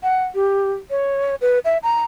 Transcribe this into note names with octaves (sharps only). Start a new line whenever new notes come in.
F#5
G4
C#5
B4
E5
A#5